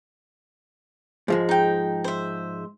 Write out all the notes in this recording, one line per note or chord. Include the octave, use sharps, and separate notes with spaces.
G#2 F3 G#3
D#4 G5
C5 E5